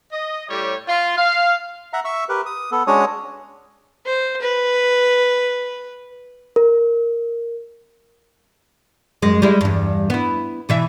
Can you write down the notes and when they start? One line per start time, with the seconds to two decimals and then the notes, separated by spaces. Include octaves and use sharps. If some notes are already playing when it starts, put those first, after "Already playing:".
0.12 D#5
0.49 A2 G3 G4 C#5
0.87 F4
1.18 F5
1.93 E5 F#5 A#5
2.05 E5 C#6 E6
2.29 G4 A#4 B4
2.46 D#6
2.72 B3 A4
2.87 G#3 C#4 D4 F#4 C#5 D#6
4.06 C5
4.41 B4
6.56 A#4
9.22 F#2 G#3
9.42 G3 G#3 E4
9.61 E2 G2
10.10 B3 E4
10.69 B2 E3 E5